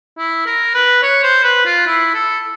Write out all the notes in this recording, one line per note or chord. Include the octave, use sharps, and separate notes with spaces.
E4
A#4
B4
C#5
C5
B4
F4
E4
A4